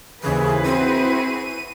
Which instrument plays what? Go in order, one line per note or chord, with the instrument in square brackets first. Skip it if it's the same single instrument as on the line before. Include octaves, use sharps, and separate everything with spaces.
[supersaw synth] D#2 C#3 E3 [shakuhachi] G#4 [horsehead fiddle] B4 C5
[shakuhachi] C4 [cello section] E4 F#4 G#4 [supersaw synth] D#7